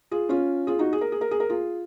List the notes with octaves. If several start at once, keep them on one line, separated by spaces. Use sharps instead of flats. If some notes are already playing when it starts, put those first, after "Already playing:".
F4 G#4
C#4 F4
F4 G#4
D#4 F#4
G#4
A#4
G#4
A#4
G#4
A#4
F4 G#4